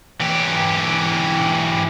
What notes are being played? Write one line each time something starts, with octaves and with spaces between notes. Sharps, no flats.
E3 G4